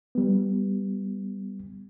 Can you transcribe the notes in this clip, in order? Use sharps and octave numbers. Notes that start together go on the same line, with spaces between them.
G3 B3